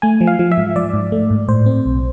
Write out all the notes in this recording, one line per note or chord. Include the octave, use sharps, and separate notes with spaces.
A3 G#5
F3
F5
F3
E5
G#2
F3 D5
G#2
A3
G#2
A2 C5
C4
B1